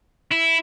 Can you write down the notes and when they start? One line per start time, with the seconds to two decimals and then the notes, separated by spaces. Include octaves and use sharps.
0.32 E4